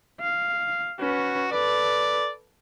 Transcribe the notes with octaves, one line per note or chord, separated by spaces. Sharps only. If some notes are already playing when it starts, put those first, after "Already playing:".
F5
C#4 F#4 B4
A4 B4 D5